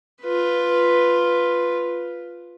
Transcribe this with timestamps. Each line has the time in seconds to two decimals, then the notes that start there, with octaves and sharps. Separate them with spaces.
0.22 F4 B4